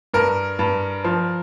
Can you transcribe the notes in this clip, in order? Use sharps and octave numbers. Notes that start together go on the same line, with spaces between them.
G2 A#4
G2
F3